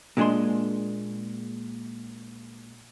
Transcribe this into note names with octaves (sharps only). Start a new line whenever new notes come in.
A#2 G#3 D4 G#4 C6